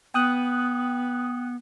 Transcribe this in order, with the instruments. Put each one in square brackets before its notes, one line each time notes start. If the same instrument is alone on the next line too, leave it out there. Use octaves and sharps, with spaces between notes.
[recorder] B3 [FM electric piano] G5 D#6 F#6